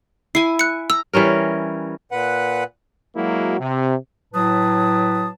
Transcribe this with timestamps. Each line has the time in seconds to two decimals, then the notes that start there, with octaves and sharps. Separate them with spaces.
0.35 E4 G#5 C7
0.59 F#6 C#7
0.90 A#5 E6
1.13 E3 G3 C#4 A#4
2.12 A#2 B4 F#5
3.16 F#3 G#3 A#3 E4 F#4
3.60 C3
4.34 A2 F#3 B4 A5 D#6